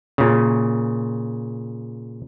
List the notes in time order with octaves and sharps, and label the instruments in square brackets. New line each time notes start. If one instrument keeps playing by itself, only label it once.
[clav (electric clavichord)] A#2 C#3